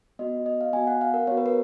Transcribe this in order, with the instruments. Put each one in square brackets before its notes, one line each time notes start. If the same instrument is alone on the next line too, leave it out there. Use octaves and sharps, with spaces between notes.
[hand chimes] B3 F#4 D#5
D#5
F5
B3 F#4 G#5
F#5
F5
A#4
B3 F#4 C#5
B4
A#4